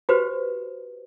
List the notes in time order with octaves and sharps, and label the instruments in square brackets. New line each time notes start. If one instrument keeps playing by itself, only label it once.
[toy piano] F#4 G4 B4 C5